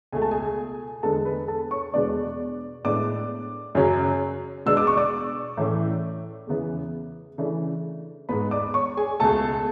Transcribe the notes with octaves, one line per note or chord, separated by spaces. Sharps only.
C#2 B2 A3 G#5
A5
G#4 G#5
E2 D3 G#3 B3 A4 A5
B4 B5
A4 A5
C#5 C#6
E2 B2 G#3 B3 D4 D5 D6
A2 G#3 B3 D4 D5 D6
F#2 C#3 F#3 C#4
B2 G#3 B3 D4 E6
D6
C#6
D5 D6
A2 E3 A3 C#4
E2 C#3 E3 B3
C#3 E3 A3 D4
G#2 G#3 B3 B4 B5
D5 D6
C#5 C#6
G#4 G#5
C#2 B2 A3 A4 A5